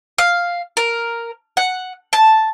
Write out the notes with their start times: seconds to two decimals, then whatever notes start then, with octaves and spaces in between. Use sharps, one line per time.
0.18 F5
0.77 A#4
1.57 F#5
2.13 A5